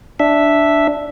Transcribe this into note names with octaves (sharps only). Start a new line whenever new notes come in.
D4 E5